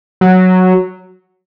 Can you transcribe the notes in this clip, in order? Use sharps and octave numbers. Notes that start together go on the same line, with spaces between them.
F#3